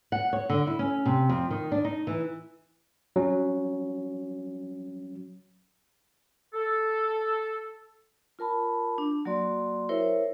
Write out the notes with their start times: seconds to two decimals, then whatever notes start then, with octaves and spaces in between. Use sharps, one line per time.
0.12 F#5
0.33 C#5
0.50 D3
0.67 E4
0.79 C#4
1.06 C3
1.29 F2
1.50 D#3
1.72 D4
1.84 D#4
2.07 E3
3.16 F#3 C#4
6.54 A4
8.39 F4 A#4 A5 B5
8.98 D4
9.25 F#3 A#3 F#4 D5 C6
9.89 E4 A#4 C5 C#5 E5